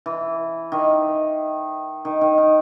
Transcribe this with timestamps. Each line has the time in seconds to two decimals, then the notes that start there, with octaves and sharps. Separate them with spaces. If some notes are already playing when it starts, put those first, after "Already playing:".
0.06 E3
0.72 D#3
2.05 D#3
2.21 D#3
2.38 D#3